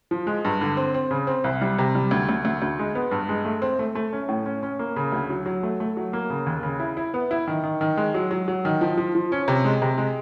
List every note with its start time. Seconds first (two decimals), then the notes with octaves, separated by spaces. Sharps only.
0.11 F3
0.27 G#3
0.45 G2
0.61 D3
0.77 C4
0.94 C4
1.11 C#3
1.27 C4
1.44 C2
1.61 G3
1.79 C3
1.95 G3
2.11 D2
2.29 D2
2.45 D2
2.62 D2
2.79 G#3
2.95 B3
3.11 G2
3.29 G#3
3.45 A3
3.62 C4
3.79 A3
3.95 A3
4.13 C#4
4.29 A2
4.46 C#4
4.63 C#4
4.79 A#3
4.96 C#3
5.12 D2
5.30 F#3
5.46 F#3
5.63 A3
5.80 A3
5.97 F#3
6.13 A#3
6.30 C#3
6.46 D#2
6.63 C#3
6.80 E4
6.97 E4
7.14 B3
7.31 E4
7.48 D#3
7.64 D#3
7.81 D#3
7.97 G#3
8.14 F#3
8.31 F#3
8.48 F#3
8.65 D#3
8.81 F3
8.97 F3
9.15 F3
9.32 C#4
9.48 C3
9.64 G#3
9.82 C3
9.98 G#3